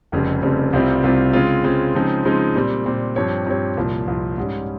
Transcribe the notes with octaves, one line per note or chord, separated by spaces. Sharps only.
F1 F2 C#3 G3 C4
F1 F2 C#3 G3 C4
C2 C3 G3 C4 F4
C2 C3 G3 C4 F4
C#3 G#3 C4 F4
C#3 G#3 C4 F4
C#3 F3 G#3 C4 D#4
C#3 F3 G#3 C4 D#4
A#2 G3 C4
A#2 G3 C4
G2 F3 C4 G4 C#5
G2 F3 C4 G4 C#5
C2 A#2 F3
C2 A#2 F3
G#2 G3 C#4